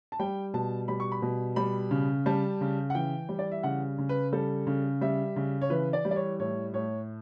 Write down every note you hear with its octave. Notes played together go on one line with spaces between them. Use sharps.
A5
G3 G5
B2 A5
G3 B5
C#6
B5
B2
G3 B5
C#3
G3 A5
C#3
F#5
E3 G5
G3
D5
E5
C#3 F#5
C#3
B4
G3 A4
C#3
G3 E5
C#3
C#5
E3 B4
D5
G3
D5
C#5
A2 C#5
A2 C#5